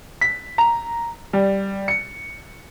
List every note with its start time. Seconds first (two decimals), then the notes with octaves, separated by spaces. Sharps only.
0.21 B6
0.58 A#5
1.33 G3
1.88 C#7